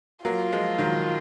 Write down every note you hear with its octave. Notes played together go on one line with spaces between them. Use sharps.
F#3 A#3 F4
F3 G#3
D#3 F#3